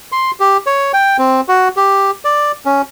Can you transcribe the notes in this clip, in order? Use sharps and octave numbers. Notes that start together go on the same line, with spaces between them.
C6
G4
C#5
G5
C4
F#4
G4
D5
C#4